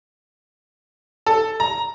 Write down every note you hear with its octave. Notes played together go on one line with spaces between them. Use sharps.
A4
A#5